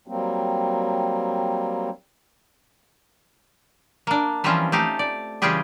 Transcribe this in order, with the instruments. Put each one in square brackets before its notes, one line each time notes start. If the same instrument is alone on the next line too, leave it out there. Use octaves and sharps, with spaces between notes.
[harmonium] F#3 G3 A#3 C4
[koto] A#3 D4
E3 F3 G3 C4 C#4 F4
A3 D#4 G4 F5
D5
C#3 E3 G3 F4 G4 G#4